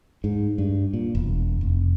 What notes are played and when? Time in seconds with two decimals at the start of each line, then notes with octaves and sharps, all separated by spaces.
0.24 G#2
0.58 G2
0.93 A#2
1.15 E1
1.61 F1